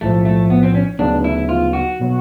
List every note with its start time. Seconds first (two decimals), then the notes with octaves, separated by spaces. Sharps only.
0.01 B1 A2 F3 A3
0.25 A3
0.50 B3
0.63 C4
0.75 C#4
0.99 D2 C#3 F#3 B3 D4 D#4
1.24 E4
1.49 F4
1.73 F#4
2.00 B2 F#3 B3